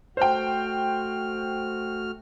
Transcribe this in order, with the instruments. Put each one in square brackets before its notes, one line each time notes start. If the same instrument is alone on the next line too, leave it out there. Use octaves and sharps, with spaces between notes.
[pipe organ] A3 F#4 F6 [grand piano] C5 G5